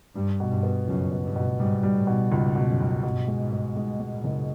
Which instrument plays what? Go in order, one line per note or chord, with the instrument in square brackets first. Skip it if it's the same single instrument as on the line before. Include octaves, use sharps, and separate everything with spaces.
[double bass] G2 [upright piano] G3
[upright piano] B2
[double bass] G2
[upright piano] B3
[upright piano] C#2 [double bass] F#2
[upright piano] B3
[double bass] G2
[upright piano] B2
[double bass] G#2 [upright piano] G3
[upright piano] G3
[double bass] A2
[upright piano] B2
[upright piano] C#2 [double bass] G#2
[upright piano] B2
[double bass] F#2
[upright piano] C#2
[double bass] G2 [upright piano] B2
[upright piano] G#3
[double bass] G#2
[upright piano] G#3
G#3
G#3
[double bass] A#2
[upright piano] F#1